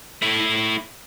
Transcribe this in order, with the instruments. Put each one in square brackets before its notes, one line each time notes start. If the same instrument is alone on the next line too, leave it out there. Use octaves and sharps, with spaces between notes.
[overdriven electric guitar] A3 E4